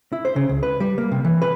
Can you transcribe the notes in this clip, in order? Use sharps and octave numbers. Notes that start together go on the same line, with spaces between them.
E4
C5
C#3
C#2
B4
G3
A#3
C3
E3
B4